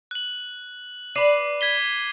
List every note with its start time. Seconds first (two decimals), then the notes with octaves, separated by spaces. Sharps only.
0.11 F#6 F#7
1.16 B4 D5 D6 C7 D#7
1.61 G#6 B6 G7